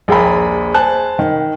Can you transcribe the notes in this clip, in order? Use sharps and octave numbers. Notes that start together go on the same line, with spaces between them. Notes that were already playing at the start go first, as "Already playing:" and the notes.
A#1 D#2 G#4 G5 A#5 B5
C5 G#5 A5 F#6
D#3